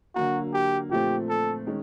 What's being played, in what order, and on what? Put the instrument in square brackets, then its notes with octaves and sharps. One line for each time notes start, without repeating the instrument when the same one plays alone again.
[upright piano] D3 F#3 A#3 [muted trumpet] F#4
[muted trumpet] G4
[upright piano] A#2 F3 A3 C4 [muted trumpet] G4
[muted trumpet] A4
[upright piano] D#3 G#3 C#4